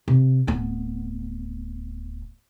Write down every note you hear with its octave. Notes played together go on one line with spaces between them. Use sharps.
C3
D1 B3